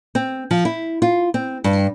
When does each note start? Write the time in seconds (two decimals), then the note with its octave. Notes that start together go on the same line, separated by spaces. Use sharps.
0.15 C4
0.51 F3
0.65 E4
1.02 F4
1.34 C4
1.64 G2